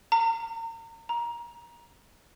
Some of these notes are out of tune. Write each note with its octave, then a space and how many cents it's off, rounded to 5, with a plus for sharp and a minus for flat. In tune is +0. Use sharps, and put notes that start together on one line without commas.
A#5 -35
A#5 +20